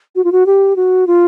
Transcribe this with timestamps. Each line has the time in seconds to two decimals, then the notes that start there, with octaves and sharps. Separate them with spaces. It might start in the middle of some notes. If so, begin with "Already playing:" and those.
0.16 F#4
0.24 F4
0.32 F#4
0.46 G4
0.76 F#4
1.07 F4